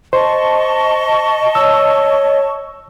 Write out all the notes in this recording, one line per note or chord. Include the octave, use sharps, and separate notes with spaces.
C5 D#5 A5 C#6
C#5 E6